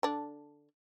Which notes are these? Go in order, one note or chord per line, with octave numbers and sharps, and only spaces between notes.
D3 D4